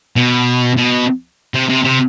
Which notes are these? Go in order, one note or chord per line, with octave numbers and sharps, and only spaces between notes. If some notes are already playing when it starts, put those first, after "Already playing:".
B2
B2
C3
C3
C3